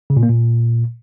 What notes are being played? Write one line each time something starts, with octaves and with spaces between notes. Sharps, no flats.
C#3
A#2
A#3
A#2